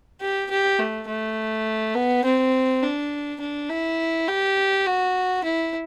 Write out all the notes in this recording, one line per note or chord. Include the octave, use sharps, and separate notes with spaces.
G4
G4
A3
A3
B3
C4
D4
D4
E4
G4
F#4
E4